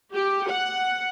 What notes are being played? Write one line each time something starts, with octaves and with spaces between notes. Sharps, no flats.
G4
F#5